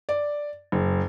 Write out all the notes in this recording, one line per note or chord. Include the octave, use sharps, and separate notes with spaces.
D5
F#1